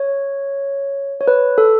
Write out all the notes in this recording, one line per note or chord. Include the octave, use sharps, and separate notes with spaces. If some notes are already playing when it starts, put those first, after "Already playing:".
Already playing: C#5
C#5
B4
A4